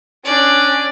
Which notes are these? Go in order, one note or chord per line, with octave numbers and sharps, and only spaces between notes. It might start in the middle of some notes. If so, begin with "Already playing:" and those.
C#4 D4 D5